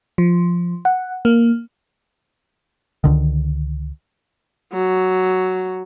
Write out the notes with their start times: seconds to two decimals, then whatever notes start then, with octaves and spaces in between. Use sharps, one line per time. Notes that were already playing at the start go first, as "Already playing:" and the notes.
0.18 F3
0.85 F#5
1.25 A#3
3.04 C#2 D3 D#3
4.73 F#3